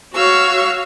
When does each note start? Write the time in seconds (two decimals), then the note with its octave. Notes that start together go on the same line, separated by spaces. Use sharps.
0.13 F#4 C#5 F5 C#6 E6